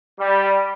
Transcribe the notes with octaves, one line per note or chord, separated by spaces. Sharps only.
G3